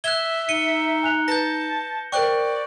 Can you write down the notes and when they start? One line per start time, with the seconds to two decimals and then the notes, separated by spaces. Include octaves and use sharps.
0.04 E5 F#6 G#6 G7
0.49 D#4 C#7 D#7 G7
1.03 G#5 F#6 F7
1.28 B4 A5 G6 A#6
2.12 A#4 C5 D5 G5 C#6 F#6